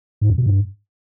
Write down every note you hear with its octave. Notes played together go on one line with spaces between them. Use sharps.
G#2
F2
B2
G2